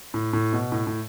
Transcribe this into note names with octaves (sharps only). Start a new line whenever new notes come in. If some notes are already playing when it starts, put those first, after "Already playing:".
A2
A2
B2
A2
A2